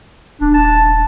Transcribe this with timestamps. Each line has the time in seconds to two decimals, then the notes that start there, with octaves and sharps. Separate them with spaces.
0.41 D#1 D4
0.54 A5